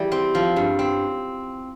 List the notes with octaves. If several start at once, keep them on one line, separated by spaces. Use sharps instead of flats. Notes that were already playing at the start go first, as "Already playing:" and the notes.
Already playing: E3 G3
C4
F3
G2
C4